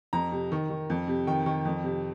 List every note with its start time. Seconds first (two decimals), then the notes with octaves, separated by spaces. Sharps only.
0.13 F2 A#5
0.32 C3
0.52 D#3
0.70 D#3
0.90 F2
1.08 C3
1.27 D#3 G5
1.46 D#3
1.65 F2
1.84 C3